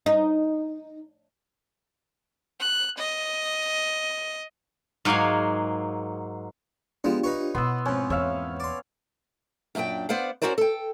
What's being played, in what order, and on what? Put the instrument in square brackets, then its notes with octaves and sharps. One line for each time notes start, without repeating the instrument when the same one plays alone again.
[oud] D#4
[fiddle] F#6
D#5
[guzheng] G#2 F#3 A#3 G#4 F5 G#5
[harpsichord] F3 G#3 B3 [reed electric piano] D4 F4 G4
[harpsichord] D#4 B4 C#5
[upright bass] B2 E4 [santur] B3 [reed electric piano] C6 E6
[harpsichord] F2 G#2 [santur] C#4
[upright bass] E2 A#3 [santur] C#5 E5 F5
[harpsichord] D5 C6
[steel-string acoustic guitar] F#2 A#2 D4 G#4 G5
B3 C5 D5 F5 F#5
C#4 D4 F#4 A#4 C5 D5
A4 G5